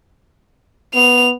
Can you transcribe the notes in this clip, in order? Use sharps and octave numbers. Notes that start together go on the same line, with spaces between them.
B3 F7